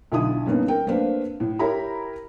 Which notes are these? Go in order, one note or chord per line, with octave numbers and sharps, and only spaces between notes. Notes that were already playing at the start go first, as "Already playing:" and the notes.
B1 D3 E4 F4 D#6
G2 A#3 B3 C#4 D#4
A#4 G5
A3 A#3 C4 D4 B4 F5
A2
E4 G4 A#4 C#5 A#5 B5